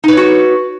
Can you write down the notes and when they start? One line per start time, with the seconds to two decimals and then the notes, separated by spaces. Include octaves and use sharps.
0.04 D#4
0.08 B4
0.13 C#5
0.17 F#4